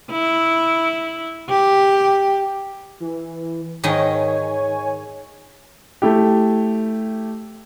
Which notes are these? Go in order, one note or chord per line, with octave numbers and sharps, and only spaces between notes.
E4
G4
E3
G#2 D#3 C#5 D#5 G#5
A3 E4 G4